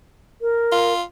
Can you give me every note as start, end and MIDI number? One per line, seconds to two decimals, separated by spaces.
0.42 0.93 70
0.72 1.02 65